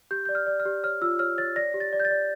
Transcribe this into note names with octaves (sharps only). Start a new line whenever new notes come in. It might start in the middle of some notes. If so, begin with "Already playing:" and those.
G4 G6
D5 G6
F6
D5
F6
G4
C#5 F6
F4 E6
C#5 F6
C#5 A6
D5 A#6
G4
A6
D5
G6
A6
D5